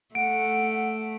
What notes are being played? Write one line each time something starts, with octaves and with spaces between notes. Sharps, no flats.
A3 F#5 D7